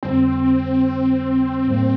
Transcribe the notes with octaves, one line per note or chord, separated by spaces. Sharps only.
F2 D3 G3 C4
A2 G3 A#3